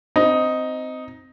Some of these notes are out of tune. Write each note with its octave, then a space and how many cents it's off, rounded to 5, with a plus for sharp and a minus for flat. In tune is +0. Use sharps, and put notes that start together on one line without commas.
C4 -15 D#4 +5